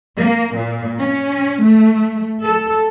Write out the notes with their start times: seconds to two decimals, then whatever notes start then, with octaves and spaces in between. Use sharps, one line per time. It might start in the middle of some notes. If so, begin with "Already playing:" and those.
0.16 A#3
0.56 A#2
1.01 C#4
1.62 A3
2.41 A4